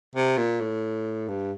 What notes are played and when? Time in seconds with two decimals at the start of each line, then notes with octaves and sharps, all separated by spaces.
0.15 C3
0.37 A#2
0.61 A2
1.28 G2